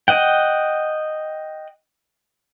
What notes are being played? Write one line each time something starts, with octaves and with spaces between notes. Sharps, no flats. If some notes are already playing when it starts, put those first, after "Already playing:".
D#5 F#5 G5